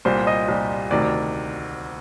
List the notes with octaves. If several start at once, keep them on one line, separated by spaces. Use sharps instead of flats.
C2 A#2 G3 C5
D#5
C2 A#2 G3
D2 C3 D#3 D5
D5